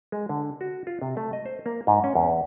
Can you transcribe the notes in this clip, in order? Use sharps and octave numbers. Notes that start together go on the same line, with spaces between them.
G#3
D3
F#4
F4
C3
A3
D#5
C5
A#3
G#2
C#4
E2